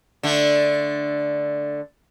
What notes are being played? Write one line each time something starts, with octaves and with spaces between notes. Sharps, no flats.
D3 A3